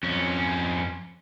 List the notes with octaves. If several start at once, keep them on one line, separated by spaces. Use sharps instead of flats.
F2 C#4